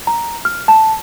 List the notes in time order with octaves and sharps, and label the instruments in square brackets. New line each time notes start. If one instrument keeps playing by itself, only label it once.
[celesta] A#5
F6
A5